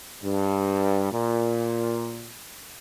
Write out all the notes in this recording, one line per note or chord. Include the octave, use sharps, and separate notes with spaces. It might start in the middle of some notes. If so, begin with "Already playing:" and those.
G2
A#2